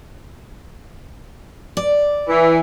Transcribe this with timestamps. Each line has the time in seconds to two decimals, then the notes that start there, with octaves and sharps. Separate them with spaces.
1.77 D5
2.28 E3